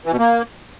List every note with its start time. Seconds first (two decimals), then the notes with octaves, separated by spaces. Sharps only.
0.06 E3
0.12 B2
0.19 A#3